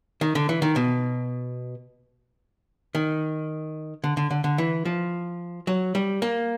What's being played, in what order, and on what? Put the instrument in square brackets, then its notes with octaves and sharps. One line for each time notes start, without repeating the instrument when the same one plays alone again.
[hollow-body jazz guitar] D#3
D3
E3
D#3
B2
D#3
D3
D3
D3
D3
E3
F3
F#3
G3
A#3